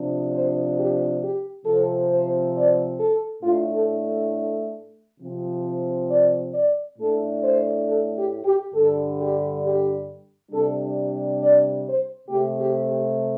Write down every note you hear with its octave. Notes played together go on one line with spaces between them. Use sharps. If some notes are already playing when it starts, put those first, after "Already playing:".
Already playing: C3 F3 D4
C5
G4
G4
C3 F3 C4 A4
C5
D5
A4
A2 A3 D4 F4
A4
C3 F3 C4
D5
D5
A2 A3 D4 A4
C5
A4
G4
G4
G2 D3 G3 A4
G4
G4
C3 G3 D4 A4
D5
C5
C3 A3 C4 G4
G4
G4